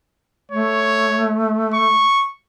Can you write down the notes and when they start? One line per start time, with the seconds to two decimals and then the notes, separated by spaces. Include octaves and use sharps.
0.52 A3 C#5
1.74 C#6